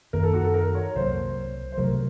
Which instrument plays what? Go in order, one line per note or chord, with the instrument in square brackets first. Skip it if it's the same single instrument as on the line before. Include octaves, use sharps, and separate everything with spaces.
[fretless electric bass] F#2 D#3 A#3 [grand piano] A#4
[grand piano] A4
F#4
A4
A#4
C#5
[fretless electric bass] C2 C3 F#3 A#3 [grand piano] C5
[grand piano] C5
[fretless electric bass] C2 C3 F#3 A3 [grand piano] A#4